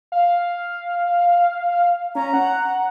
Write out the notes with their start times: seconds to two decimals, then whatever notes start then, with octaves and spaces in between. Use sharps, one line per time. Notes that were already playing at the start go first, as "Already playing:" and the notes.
0.12 F5
2.15 C#4 A#5
2.33 F#5